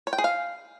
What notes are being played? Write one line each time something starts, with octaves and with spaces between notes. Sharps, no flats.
C#5
G5
G#4
F5